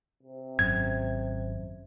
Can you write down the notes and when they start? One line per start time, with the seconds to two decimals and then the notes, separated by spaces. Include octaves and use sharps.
0.23 C3
0.59 G#1 F#2 G#6